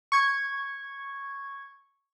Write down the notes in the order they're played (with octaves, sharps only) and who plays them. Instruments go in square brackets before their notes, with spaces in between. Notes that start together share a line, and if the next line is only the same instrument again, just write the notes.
[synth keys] C#6 G#6